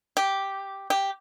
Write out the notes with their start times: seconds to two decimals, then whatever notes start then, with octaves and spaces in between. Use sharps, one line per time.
0.17 G4
0.90 G4